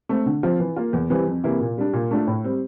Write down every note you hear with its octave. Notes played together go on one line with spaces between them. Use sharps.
A3 C4
D3
F3 C4 F4
E3
A#3 F4
E2
E3 G3 C4
F2
C3 E3 A#3 E4
A#2
G3 D4
A#2
A3 D4 F4
A2
G3 C4